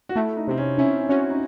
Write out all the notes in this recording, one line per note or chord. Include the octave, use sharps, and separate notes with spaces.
F#4
A3 E4
D#4
C3 C4
C#4
C#4 E4
C#4 F#4
D#4